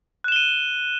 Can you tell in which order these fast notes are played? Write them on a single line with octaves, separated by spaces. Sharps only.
F#6 E7 G7 D#7